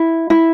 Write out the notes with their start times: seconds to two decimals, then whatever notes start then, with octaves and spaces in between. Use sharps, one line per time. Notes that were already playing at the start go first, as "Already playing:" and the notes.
Already playing: E4
0.30 E4